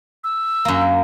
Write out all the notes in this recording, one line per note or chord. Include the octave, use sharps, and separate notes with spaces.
E6
F#2 A#3